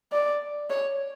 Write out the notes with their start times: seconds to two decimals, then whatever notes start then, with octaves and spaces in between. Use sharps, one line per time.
0.12 D5
0.70 C#5